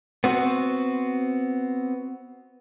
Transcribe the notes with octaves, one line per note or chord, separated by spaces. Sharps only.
B3 C4 F#4